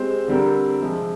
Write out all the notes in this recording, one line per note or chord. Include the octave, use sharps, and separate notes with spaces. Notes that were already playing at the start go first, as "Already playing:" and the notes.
Already playing: G#3 C4 G4 C5
D3 G3 C4 G4 A#4
C3 F3 G#3